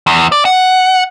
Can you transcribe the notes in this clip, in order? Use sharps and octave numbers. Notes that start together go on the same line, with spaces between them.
E2
D5
F#5